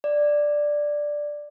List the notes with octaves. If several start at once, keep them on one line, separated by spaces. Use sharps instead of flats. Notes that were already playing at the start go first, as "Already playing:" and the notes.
D5